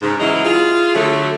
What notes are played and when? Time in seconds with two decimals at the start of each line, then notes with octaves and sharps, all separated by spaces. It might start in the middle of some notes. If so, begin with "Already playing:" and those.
0.02 G#2 C#3
0.20 E3 F#3 G#3 C#4 D#4 E4
0.45 F4 G#4
0.95 D3 F#3 A3